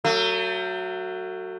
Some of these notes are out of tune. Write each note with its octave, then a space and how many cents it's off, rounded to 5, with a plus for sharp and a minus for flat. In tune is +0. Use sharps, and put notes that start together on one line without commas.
F#3 +0 A3 +35